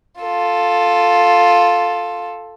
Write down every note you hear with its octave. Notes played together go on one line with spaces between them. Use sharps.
F4 A4